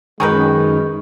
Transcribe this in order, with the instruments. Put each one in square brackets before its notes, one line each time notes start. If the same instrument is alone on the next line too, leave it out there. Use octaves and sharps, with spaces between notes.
[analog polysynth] F#2 D#3 [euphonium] G#3 [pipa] G#4 A#4 B4 [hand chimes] C#6 G6